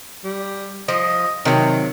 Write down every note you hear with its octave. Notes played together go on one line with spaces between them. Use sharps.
G3
F3 D#5
C3 D#3 F#3